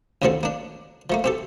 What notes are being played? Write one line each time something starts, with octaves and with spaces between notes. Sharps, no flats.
A1 D#2 D3 F3 C4 A4
A#3 D4
F3 A3 A#3
C4 G4 A4